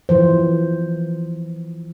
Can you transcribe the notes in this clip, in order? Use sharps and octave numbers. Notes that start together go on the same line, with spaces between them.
E3 F3 C5